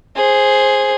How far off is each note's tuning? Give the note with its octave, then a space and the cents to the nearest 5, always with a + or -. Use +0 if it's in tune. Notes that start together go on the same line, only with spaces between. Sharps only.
G#4 +0 C5 +10